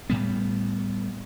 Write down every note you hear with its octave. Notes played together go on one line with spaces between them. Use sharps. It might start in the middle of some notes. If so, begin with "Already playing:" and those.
A2 G3 B3